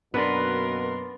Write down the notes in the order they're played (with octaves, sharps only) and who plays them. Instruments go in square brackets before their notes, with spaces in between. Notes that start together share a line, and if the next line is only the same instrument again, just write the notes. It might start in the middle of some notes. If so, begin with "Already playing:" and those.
[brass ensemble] F#2 B2 A#3 [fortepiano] B3 D4 [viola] A#4 C6 [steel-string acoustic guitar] B4